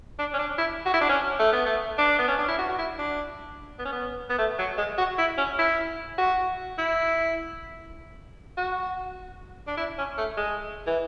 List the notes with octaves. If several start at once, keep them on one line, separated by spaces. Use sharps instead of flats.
D4
C#4
D4
E4
F#4
E4
D4
C#4
A3
B3
A3
D4
B3
C#4
D4
E4
F#4
F#4
E4
D4
B3
C#4
B3
B3
A3
F#3
G#3
F#4
E4
C#4
E4
F#4
E4
F#4
D4
E4
C#4
A3
G#3
E3